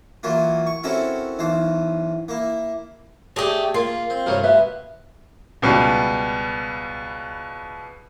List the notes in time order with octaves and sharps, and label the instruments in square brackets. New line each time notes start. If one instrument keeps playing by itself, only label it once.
[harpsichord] E3 F#3 A#3 F4
C#6
C4 C#4 E4 F#4 A4 A#4
B1 E3 C5 F5
A#3 E4
[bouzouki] A3 G4 [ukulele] G#4 [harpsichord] C#5 D5 D#6
[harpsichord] A#3 [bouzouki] F4
[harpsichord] C4
[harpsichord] G2 C3 G3 [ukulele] A#4 C#5
[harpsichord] B2 [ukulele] B4 E5
[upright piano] C#2 B2 G3